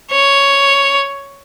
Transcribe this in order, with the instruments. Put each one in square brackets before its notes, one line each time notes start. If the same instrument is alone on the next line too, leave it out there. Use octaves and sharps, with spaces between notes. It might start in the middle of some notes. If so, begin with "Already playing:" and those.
[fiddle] C#5